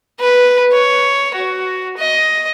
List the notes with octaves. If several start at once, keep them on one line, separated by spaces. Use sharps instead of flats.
B4
C#5
F#4
D#5